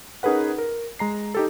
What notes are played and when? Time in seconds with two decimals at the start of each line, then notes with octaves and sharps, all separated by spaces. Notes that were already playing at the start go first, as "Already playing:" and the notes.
0.23 C#4 D#4 G#4 A#4 B4 F#5
0.58 A#4
0.99 G#3 A#5 C7
1.35 D#4 G4 A4